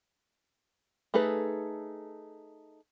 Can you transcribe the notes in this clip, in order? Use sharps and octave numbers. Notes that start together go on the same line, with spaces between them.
A3 D#4 G#4 A4 B4